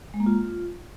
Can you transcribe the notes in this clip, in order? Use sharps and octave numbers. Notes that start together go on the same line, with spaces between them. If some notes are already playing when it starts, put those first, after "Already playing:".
G#3
A#3
F4